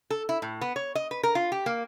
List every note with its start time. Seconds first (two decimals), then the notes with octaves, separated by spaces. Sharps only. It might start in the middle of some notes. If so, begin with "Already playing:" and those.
0.10 A4
0.29 E4
0.42 A2
0.61 B3
0.76 C#5
0.95 D#5
1.11 B4
1.23 A#4
1.35 F4
1.52 G4
1.66 A#3